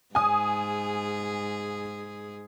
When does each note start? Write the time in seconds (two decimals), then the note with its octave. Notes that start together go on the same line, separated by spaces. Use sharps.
0.15 G#2 G#4 G#5 D#6